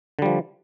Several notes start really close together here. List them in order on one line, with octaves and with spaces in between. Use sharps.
D3 G3 F3